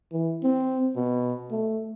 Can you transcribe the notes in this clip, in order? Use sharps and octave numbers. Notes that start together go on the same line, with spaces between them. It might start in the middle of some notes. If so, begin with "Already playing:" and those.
E3
C4
B2
A3